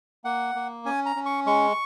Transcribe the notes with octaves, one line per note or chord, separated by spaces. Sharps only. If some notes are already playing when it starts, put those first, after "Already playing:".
A#3 F#5
A#3
C#4 G#5
A#5
C#4
C#6
G#3 C#6